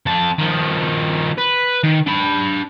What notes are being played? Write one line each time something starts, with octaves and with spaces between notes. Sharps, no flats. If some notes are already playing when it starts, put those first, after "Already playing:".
F2 A5
D#3 F3
B4
D#3
D4 B5